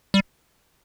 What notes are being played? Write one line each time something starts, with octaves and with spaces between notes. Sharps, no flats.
G3